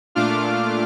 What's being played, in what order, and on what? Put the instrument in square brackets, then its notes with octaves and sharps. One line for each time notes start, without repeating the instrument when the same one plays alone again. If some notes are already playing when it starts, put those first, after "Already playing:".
[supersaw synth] A#2 A3 D4 F4 D6 F6